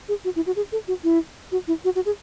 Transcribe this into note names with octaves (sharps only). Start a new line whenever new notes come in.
G#4
F#4
E4
F#4
G#4
A4
F#4
E4
F#4
E4
F#4
F#4
G#4